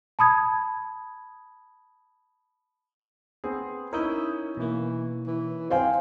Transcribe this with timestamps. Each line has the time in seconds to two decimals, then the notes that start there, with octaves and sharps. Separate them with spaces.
0.19 A5 B5 D#6 G#6
3.44 B3 C4 G#4
3.93 C#4 D#4 E4 A#4 C#5 D#6 G6
4.57 B2 E3 A#3
5.27 E3
5.70 C4 C5 F5 G#5